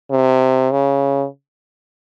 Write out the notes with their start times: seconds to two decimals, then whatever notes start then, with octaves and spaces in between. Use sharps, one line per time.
0.11 C3
0.72 C#3